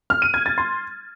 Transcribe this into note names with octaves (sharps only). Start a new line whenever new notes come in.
F6
D#7
G#6
A6
C6